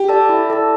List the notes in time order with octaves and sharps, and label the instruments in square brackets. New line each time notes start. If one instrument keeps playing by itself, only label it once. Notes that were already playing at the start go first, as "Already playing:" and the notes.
Already playing: [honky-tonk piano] G4
[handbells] A4 D5 A5
E4
A4 D5 A5